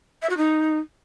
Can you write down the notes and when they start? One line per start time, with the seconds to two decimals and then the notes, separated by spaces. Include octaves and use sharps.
0.22 E5
0.29 F#4
0.37 D#4